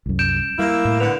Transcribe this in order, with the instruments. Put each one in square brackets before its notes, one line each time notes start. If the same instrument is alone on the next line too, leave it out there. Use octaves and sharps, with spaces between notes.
[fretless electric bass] C2 F#2
[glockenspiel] G6 D7 E7
[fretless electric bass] G3 [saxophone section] A#3 E4
[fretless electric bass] A2
[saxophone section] D3 B3 [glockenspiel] F7